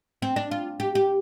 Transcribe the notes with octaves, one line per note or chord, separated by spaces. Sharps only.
C4
D4
F4
G4
G4